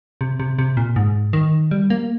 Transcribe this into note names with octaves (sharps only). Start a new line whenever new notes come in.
C3
C3
C3
A#2
G#2
D#3
G3
A#3